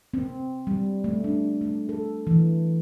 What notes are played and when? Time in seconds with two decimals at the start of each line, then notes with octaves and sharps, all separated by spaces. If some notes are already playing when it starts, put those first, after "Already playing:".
0.14 C4
0.67 G3
1.04 A3
1.24 D4
1.61 A3
1.89 A4
2.27 E3